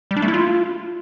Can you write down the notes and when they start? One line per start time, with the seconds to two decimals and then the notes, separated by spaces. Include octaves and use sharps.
0.11 G3
0.16 D4
0.22 A3
0.28 E4
0.34 F4